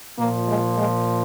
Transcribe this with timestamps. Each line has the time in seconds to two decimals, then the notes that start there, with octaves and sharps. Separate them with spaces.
0.18 A#2 F3 A#3
0.48 G#3
0.77 G#3